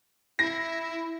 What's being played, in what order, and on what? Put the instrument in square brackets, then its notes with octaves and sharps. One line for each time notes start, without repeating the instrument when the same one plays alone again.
[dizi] E4 [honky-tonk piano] A#6